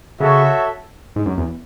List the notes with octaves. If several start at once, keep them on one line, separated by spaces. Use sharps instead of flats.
C#3 F#4 A4 C#5 E5
G#2
F#2
E2